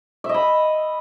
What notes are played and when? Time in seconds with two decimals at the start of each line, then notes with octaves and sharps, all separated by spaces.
0.24 E5
0.29 D#5
0.34 B5